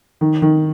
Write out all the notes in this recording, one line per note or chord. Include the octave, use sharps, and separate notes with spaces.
D#3
D#3